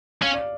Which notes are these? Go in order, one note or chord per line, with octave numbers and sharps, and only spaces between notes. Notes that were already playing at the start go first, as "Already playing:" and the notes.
C#4 F5
D5